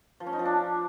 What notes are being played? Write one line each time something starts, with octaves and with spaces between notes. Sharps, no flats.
F3
C#4
D#4
F3
D4